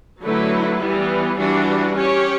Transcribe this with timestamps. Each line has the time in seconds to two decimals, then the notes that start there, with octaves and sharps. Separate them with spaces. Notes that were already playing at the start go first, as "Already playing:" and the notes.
0.23 D3 F#3 A3 E4 B4
0.81 E3 G3 B3
1.38 E3 G3 D4 F#4
1.95 C#4 G4 C#5